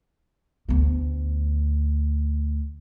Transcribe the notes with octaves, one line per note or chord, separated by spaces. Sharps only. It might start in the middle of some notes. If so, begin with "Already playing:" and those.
D2 B3